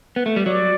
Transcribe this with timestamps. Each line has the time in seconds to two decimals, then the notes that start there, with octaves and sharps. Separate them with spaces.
0.16 B3
0.26 A3
0.36 G3
0.46 F#3 D5